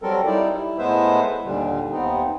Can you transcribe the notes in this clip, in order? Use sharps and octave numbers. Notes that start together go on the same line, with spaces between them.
F#3 G3 C4 A4 A#4
G3 D#4 E4 D5
E4
A2 G#3 B3 B4 C5 E5
D#2 A#2 D3 G3
D#2 B3 C4 D#4